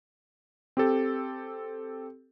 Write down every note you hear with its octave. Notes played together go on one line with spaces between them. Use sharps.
C4 G4 A4